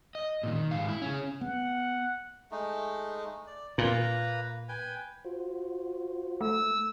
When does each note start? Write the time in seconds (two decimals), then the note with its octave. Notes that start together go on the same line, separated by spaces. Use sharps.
0.15 D#5
0.43 A#2 D#3
0.55 D#3
0.71 G#2 F5
0.88 E4
1.02 C#4 G#4
1.41 B3 F#5
2.51 G#3 A3 D#4
3.47 D5
3.78 A#2 A#3 B4 A#5
4.69 B4 G5 G#5
5.25 F4 F#4 C5
6.41 A3 E6